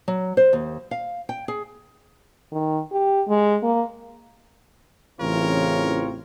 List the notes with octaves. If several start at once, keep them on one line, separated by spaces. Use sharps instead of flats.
F#3
C5
D#2
F5
G5
G#4
D#3
G4
G#3
A#3
A1 C#3 E3 C4 F4 A#4 C#5